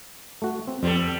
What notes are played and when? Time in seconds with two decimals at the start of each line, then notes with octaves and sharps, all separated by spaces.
0.42 A3 F#4
0.68 C4
0.83 F2 G3 B3 A4